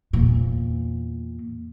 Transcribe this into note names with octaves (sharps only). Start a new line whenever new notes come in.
E2 A#2